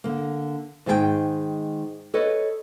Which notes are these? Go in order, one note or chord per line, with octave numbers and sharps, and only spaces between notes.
D3 A#3
G#2 D#3 G#4 A4 G5
A4 B4 C#5 D#5